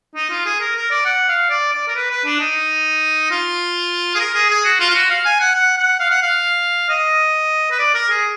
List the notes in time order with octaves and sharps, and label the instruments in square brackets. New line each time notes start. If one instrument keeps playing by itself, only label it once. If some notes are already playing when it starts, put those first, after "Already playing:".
[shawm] D#4
F4
G#4
A#4
A#4
D5
F#5
F5
D5
D5
A#4
B4
B4
D4
D#4
F4
G#4
A#4
G#4
G#4
F#4
F4
F4
F#4
F5
G#5
F#5
F#5
F#5
F5
F#5
F5
D#5
B4
D5
A#4
G#4